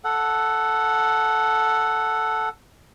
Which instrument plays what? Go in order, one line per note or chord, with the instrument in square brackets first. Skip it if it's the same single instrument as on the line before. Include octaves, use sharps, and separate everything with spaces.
[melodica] A4 F#5